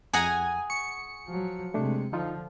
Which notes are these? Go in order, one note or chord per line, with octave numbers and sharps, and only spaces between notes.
F2 G#4 F#5 G#5 A#5
C#6 C#7
F3 F#3
C3 G#3 A3 D4
D3 F3 D#4 F4